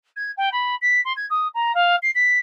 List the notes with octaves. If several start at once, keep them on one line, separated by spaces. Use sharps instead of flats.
G#6
G5
B5
B6
C6
G#6
D#6
A#5
F5
C7
B6